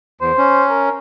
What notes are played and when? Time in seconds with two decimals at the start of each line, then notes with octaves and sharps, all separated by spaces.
0.21 E2 C5
0.38 C#4
0.70 A#4